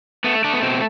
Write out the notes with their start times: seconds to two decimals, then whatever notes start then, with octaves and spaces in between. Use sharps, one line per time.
0.24 A3 B3
0.44 A3 D4
0.53 B3
0.62 B2 C4